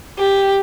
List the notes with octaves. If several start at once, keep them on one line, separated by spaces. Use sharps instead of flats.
G4